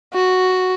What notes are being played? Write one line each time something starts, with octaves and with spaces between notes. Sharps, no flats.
F#4